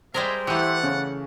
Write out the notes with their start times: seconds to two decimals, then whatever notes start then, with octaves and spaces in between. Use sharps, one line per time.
0.14 G3 G#3 C4 G#4 A#4 C5 E5
0.47 E3 A3 E4 G4 D5 F#5
0.83 C#3